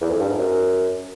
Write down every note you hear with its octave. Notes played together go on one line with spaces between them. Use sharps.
E2
F2
G2
G#2
F#2